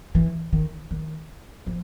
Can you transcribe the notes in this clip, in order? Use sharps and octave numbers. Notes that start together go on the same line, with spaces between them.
E3
D#3
D#3
F3